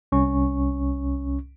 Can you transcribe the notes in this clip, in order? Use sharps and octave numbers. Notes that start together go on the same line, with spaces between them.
C2 C#4 C#6